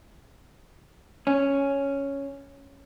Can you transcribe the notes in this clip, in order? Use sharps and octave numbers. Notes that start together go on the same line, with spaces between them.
C#4